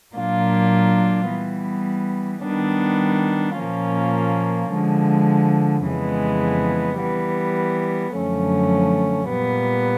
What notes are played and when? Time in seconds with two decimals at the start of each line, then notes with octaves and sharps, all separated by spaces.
0.15 A#2 F#3 A#3 D4 F4
1.30 E3 G3 B3
2.44 D#3 G3 B3 D4
3.58 A#2 F3 A#3 C#4 F4
4.73 D3 F3 G#3
5.86 F2 C#3 E3 G#3 B3
7.00 E3 G3 B3
8.15 F#2 D3 F3 A3 C#4
9.29 A#2 G3 B3